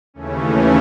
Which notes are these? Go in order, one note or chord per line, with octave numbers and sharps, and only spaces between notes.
D#2 C#3 E3 A3 C#4